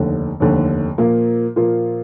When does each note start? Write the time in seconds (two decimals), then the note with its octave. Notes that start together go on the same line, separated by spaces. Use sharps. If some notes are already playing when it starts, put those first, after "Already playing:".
Already playing: F1 D#2 D3
0.40 F1 D#2 D3
0.98 A#2 F3 A#3 F4
1.56 A#2 F3 A#3 F4